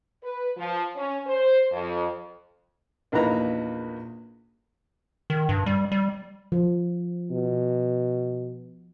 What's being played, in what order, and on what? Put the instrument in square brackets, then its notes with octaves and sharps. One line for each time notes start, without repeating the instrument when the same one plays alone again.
[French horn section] B4
F3
C#4
C5
F2
[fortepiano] A#1 E2 A#3 D#4 B4 A#5
[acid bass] D#3
G2
G3
G3
[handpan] F3
[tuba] B2